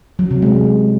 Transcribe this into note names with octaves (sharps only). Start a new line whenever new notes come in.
F#3
C3
G#3